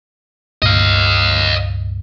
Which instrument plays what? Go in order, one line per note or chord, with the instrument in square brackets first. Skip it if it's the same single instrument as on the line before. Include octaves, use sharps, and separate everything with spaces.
[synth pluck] C#2 G2 A#2 [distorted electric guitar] D#5 F5